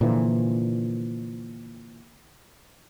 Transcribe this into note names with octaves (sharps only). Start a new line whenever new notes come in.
A#2 D3 E3 F3